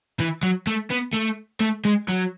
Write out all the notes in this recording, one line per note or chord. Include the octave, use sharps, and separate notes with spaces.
E3
F#3
A3
B3
A3
A3
G#3
F#3